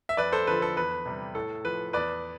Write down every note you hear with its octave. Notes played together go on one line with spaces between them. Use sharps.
E5
F2 B4 D5
A4 C5
D3 F3 B4
A4
E2 B4
C3 G3
A2 A4
F3 B4
E2 B4 D5